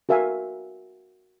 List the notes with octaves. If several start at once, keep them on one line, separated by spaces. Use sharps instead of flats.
F#4 A#4 E5 F5 G#5